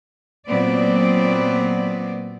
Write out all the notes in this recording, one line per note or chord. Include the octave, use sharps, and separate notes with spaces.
A#2 F#3 B3 C4 D5